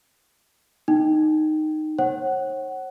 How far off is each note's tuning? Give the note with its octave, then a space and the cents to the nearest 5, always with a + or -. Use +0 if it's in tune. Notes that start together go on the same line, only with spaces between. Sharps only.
D#4 -10 G5 +0
C#5 -40 F#5 +20